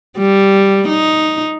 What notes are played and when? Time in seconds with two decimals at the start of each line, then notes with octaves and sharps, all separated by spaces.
0.18 G3
0.89 D#4